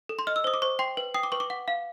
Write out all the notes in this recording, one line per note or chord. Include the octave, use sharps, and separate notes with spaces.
A4
C6
D#5 F6
E6
C5 D#6
D6
C5 C#6
G5 C6
B4
G5 D#6
D6
B4 C#6
D6
F#5
F5